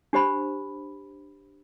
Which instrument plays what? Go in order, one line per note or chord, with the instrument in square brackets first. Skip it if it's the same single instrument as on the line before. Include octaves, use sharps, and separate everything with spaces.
[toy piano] D4 G4 C5 B5